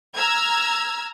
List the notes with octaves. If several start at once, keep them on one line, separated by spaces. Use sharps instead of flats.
A#5 E6 F6 G#6